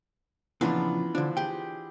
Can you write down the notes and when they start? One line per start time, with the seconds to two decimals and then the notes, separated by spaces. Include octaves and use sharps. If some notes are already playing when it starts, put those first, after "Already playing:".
0.61 A#2 C#3 E3 F3 B3 D4 F4
1.15 D3 F3 D4
1.37 G4 G#4 G5